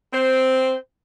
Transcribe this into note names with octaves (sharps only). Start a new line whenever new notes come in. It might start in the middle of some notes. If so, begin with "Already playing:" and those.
C4 C5